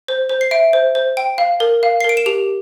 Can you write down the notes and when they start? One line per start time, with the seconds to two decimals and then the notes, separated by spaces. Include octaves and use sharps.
0.08 C5
0.29 C5
0.41 C7
0.51 E5 D7
0.73 C5
0.95 C5
1.17 G5
1.38 F5
1.60 A#4
1.83 F5
2.00 C7
2.04 A#4 D7
2.17 E7
2.26 G4 F7